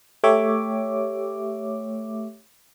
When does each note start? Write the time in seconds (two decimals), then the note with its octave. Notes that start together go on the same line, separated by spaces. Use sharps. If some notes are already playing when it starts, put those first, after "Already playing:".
0.24 A3 G4 C#5 E5 D6